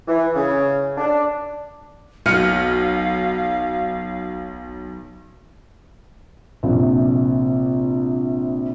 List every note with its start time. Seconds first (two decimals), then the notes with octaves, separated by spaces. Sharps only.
0.07 E3
0.35 C#3
0.97 D4
2.26 B1 F5 F6 C#7
6.63 A#1 C3